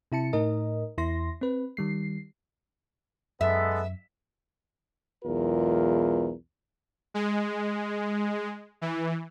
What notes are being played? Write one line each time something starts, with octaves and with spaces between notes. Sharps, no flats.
C3 E4 A5 C#7
A2 D#4 A#4 D#5
E2 E4 C6 A#6
C4 B4
D#3 G3 C7
F#2 G#3 B3 A4 E5
B1 E2 G#3 F4 A#4
G#3
E3